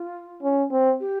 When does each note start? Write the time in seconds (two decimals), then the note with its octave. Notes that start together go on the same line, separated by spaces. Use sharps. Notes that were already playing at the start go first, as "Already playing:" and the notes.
Already playing: F4
0.43 C#4
0.71 C4
1.00 G4